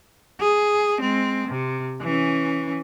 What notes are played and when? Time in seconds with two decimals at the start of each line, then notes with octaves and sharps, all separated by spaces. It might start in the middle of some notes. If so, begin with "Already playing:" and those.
0.40 G#4
1.01 G#3 C4
1.47 C3
2.02 E3 C#4